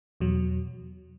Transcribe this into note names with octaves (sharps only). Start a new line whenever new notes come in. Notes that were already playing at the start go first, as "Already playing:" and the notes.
E2 B2 F#3